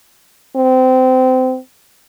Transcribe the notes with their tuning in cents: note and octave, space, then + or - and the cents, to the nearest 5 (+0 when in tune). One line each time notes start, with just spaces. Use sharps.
C4 -25